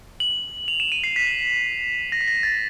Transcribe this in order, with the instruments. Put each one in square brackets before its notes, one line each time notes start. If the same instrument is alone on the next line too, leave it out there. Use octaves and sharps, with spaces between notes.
[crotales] F#7
F7
E7
D#7
C7
B6
A#6
B6
A#6
A6